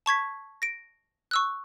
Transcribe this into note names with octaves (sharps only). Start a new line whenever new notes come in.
A5 C#6 G#6 B6
A#6 D7
C#6 E6 F#6